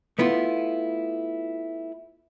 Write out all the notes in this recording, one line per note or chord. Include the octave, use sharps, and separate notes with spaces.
A3 B3 E4 F4